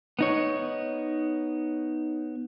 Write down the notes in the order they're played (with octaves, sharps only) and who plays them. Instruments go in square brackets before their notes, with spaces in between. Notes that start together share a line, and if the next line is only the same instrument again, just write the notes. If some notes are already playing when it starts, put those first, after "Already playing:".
[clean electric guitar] B3 D#4 C#5